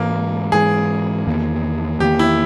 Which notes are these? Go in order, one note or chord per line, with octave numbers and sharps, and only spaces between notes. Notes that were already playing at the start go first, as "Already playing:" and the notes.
Already playing: G#2 E3 G#3 A#3
G#2 E3 G#3 G#4
E2 D#3 A#3
E2 D#3 A#3 G4
E4